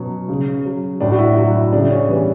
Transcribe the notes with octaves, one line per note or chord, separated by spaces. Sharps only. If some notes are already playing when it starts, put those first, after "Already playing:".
Already playing: B2 F#3 C#4
C#3
F#3
A2 D4
F#4
E4
F#3 F#4
E4
C#3 D4
C#4
E3 G3 B3